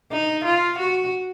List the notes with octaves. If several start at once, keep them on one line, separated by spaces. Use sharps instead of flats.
D#4
F4
F#4